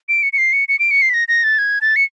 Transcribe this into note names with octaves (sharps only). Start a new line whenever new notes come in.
D7
C#7
C#7
C7
C#7
C#7
D7
C#7
C7
B6
A#6
A#6
A6
G#6
A6
C#7